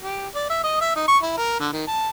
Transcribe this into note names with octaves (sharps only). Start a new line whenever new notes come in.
G4
D5
E5
D#5
E5
D#4
C#6
E4
A#4
D3
D#3
A5